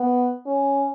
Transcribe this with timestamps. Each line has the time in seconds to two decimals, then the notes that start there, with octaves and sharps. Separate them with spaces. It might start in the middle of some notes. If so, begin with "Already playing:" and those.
Already playing: B3
0.46 C#4